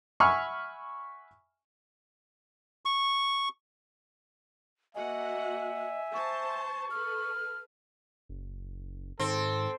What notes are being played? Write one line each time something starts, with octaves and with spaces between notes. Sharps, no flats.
E5 F#5 G#5 B5 C#6 F6
C#6
A#3 F#4 D#5 E5 F#5 G#5
C5 A5 C#6
A4 B4 F6
F#1
G#2 D#3 C4 A4